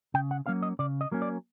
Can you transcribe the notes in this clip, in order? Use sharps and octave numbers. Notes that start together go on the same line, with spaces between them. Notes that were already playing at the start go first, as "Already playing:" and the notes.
C#3 G5
F#5
F#3 A#3 C#4 F5
D#5
C#3 D5
D#5
F#3 A#3 C#4
D5